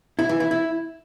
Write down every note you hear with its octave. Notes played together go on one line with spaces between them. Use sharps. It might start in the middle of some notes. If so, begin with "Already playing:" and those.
E4
E3
E4
E4